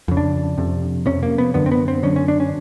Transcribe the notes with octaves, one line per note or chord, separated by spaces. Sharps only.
F2 C#3
D4
F2 C3
F2 C3 C#4
A#3
B3
F#2 D3 B3
C4
B3
C4
F#2 D3 C#4
C#4
D4
C#4